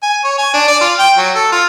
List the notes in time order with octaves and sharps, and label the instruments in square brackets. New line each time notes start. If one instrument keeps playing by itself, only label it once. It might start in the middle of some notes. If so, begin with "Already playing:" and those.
[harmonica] G#5
C#5
G#5
D4
D5
F4
G5
F#3
A4
F4